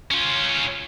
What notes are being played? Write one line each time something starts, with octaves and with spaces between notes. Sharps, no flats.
C#4 F4